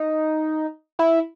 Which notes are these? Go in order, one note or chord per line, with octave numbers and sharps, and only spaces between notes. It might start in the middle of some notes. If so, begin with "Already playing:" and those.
Already playing: D#4
E4